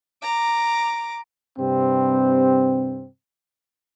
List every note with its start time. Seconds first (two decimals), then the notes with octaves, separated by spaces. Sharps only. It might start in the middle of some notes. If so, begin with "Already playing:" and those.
0.23 A#5 D6
1.59 G2 C3 C4